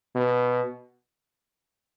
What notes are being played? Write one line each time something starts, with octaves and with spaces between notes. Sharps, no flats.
B2